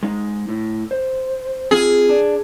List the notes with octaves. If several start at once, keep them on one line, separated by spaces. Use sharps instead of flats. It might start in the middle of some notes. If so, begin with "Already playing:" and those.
G#3 D#4
A2
C5
C4 F4 G#4
D4